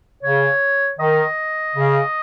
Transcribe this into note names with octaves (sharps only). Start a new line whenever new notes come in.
C#3 C#5
D#3 D#5
C#3